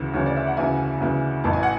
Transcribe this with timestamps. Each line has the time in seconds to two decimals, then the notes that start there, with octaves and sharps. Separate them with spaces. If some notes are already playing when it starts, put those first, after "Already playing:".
Already playing: D2 C#3 E3
0.14 D2 C#3 E3 C#5
0.26 D5
0.36 E5
0.47 F#5
0.57 D2 C#3 E3 E5 G#5
1.00 D2 C#3 E3
1.44 A1 A2 E3 A5
1.53 G#5
1.63 F#5